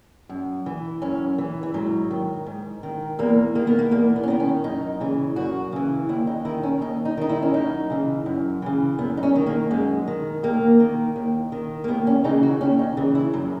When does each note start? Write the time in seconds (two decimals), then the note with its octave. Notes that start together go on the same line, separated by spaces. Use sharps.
0.29 F#2
0.66 E3
1.02 F#2 C#4
1.38 E3
1.63 E3
1.74 G#2 F#3
2.11 D#3
2.46 G#2
2.83 D#3
3.19 E2 A#3
3.55 D#3 A#3
3.67 B3
3.79 A#3
3.91 E2 A#3
4.16 B3
4.23 C#4
4.28 D#3 B3
4.40 C#4
4.64 F#2 D#4
5.00 C#3 E3
5.36 F#2 F#4
5.72 C#3 E3
6.09 D#2 E4
6.27 D#4
6.45 D#3 E4
6.63 C#4
6.81 D#2 D#4
7.05 D#4
7.17 D#3 D#4
7.29 E4
7.42 C#4
7.54 F#2 D#4
7.90 C#3 E3
8.26 F#2
8.62 C#3 E3
8.99 F#2 B3
9.17 D#4
9.23 C#4
9.35 D#3
9.46 A#3
9.71 F#2 G#3
10.07 D#3
10.43 D#2 A#3
10.80 D#3
11.16 D#2
11.52 D#3
11.84 A#3
11.88 D#2 B3
12.07 C#4
12.24 C#3 E3 D#4
12.43 F#4
12.61 D#2 C#4
12.79 D#4
12.97 C#3 E3
13.15 E4
13.33 F#2 F#3